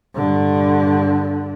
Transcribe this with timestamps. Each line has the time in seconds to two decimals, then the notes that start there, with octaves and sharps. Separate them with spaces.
0.15 G2 D3